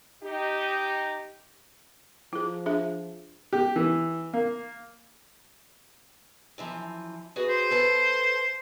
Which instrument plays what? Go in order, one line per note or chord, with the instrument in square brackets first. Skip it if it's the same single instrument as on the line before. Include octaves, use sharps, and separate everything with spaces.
[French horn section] D#4 G4
[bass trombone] F3 [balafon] E4 G#4
[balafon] D4 G#4 E5
[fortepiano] G4
E3
A#3
[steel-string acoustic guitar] F#2 E3 F3
F#4 G#4 B4
[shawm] C5
[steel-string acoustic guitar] A4 B4 A5